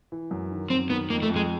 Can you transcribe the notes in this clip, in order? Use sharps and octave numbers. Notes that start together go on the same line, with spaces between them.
E3
F#2
D#3
F#2 C4
D#3 B3
F2 A#3
A3
F2
G#3